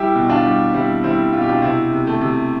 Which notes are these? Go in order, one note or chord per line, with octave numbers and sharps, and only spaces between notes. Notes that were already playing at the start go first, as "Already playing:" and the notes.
Already playing: G3 E4 G4
B2
D4 F4
G3
G3 C4 E4
G3 C4 E4
B2 F4
G4
D4 F4
C3 C4 E4
C3
A3
C3